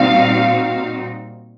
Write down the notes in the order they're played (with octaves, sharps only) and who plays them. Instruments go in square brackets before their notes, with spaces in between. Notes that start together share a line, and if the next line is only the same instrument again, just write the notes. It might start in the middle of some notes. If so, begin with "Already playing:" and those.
Already playing: [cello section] A#2 G3 C4 D#4 F#4 [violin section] F5